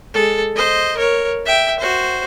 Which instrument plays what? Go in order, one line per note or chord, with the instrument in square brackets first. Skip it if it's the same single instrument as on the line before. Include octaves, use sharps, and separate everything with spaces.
[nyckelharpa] G#3 A4
C5 D#5
A#4 C#5
E5 G5
F#4 C5